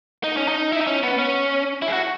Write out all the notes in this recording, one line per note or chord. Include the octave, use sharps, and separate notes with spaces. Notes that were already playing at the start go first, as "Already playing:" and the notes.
D#4
C#4
D#4
E4
D#4
C#4
B3
C#4
E4
G#4
F#4